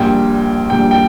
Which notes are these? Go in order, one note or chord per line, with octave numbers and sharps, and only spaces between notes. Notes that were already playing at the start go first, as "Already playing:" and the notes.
Already playing: A#1 A#2 G3 G5
A#1 A#2 G3 G5
G5